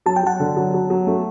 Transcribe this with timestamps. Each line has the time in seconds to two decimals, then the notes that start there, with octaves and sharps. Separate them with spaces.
0.06 F#3 A5
0.16 G5
0.23 F#3 F#5 A5
0.40 D3
0.56 F#3
0.74 F#3
0.90 F#3
1.07 A3